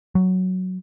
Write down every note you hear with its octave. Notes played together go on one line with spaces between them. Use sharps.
F#3